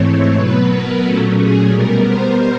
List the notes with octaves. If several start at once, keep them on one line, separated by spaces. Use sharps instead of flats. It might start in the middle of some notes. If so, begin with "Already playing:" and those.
Already playing: G#2 E3 A3 C4 C#5
B2 F#3 B3 B4
A#4
A#2 F#3 A3 C#4 A4
G#4
B2 G3 B3 A#4
C5